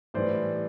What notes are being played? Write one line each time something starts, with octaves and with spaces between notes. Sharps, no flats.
A2 E3 G3 C5 D5